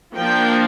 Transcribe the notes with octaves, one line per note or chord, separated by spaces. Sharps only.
F3 A#3 D4 G5